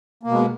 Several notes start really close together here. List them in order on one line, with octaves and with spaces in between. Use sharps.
A#3 B2 G#3